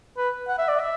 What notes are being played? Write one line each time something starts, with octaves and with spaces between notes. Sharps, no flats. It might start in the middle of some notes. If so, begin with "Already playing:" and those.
B4
F#5
E5
D5
E5